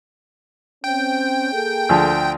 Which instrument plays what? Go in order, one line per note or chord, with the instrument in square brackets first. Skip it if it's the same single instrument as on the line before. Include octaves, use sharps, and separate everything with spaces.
[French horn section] C4 C#4 [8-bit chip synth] G5
[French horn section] A#3 G#4 A4
[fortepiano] D2 F3